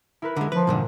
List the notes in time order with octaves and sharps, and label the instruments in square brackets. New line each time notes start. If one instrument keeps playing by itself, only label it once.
[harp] E4 A#4 B4
[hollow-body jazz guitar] D3 G#3 [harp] A#4
[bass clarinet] F3 [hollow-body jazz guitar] B4
[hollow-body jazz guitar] E2 G2 D3 [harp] A#2